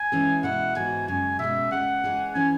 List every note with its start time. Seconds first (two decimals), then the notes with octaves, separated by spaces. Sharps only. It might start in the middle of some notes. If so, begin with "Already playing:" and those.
Already playing: G#5
0.12 E3 G#3 C#4 G#4
0.43 B2 G#3 E4 F#5
0.75 G#2 E3 B3 F#4 G#5
1.08 F#2 C#3 G#3 G#5
1.39 B2 G#3 C#4 E5
1.71 C#3 G#3 B3 F#5
2.04 E3 G#3 C#4 G#4
2.35 E3 C#4 G#5